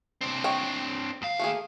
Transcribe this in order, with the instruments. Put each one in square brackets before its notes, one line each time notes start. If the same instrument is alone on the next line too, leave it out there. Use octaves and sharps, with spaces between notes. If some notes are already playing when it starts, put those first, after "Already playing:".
[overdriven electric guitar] C4 D4
[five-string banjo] C#5 D#5 G5
[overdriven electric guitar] D#2 F5
[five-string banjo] A3 A#3 G#4